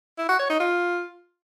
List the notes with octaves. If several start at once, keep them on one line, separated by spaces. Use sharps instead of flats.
E4
F#4
C#5
D#4
F4